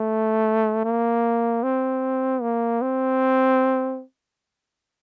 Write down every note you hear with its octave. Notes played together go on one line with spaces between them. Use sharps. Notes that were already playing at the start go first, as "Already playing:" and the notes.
Already playing: A3
A#3
C4
A#3
C4